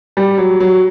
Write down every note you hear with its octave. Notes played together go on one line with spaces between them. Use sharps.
G3
F#3
F#3